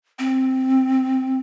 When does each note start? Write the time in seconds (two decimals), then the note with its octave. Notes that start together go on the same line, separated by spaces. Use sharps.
0.19 C4